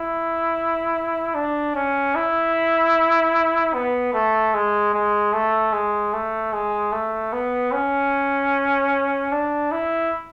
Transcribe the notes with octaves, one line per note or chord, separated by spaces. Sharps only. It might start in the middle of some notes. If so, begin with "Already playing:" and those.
Already playing: E4
D4
C#4
E4
B3
A3
G#3
G#3
A3
G#3
A3
G#3
A3
B3
C#4
D4
E4